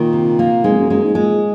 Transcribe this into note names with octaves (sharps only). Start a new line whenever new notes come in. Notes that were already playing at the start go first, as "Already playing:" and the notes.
Already playing: A#2 D#3
C3
A#3
G#2 G#3
F2
F#2
F#2 G#3
G#2
A#2 G#3